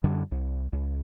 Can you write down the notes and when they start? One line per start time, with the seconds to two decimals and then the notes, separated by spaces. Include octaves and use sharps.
0.04 F#2 D3 G3
0.32 C2
0.73 C#2